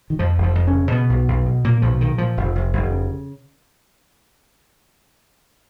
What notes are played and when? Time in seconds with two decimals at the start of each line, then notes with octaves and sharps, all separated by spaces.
0.10 D#3
0.19 F2 F3
0.38 F1
0.43 F3
0.55 F2
0.67 C#4
0.74 C#3
0.92 B2 B3
1.09 B1
1.28 B1
1.46 B2
1.64 A#2 A#3
1.82 B1 F3
2.00 A#2 D#3
2.18 A#2 F3
2.37 F1
2.55 F1
2.73 F1
2.90 C#3